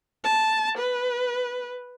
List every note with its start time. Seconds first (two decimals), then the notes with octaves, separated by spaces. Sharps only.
0.24 A5
0.78 B4